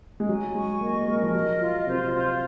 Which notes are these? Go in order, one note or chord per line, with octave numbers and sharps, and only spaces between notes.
G#3
F#3 G#5
G#3 C#6
A#3 D#5
A#3
G#3 A#4
F3
F#3 D#5
F4
C3 C5
F4